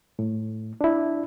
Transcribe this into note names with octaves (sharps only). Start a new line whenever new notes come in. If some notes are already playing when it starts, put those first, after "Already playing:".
A2
D4 E4